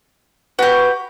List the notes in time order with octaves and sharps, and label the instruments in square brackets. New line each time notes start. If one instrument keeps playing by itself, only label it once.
[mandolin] F#4 G4 [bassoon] B4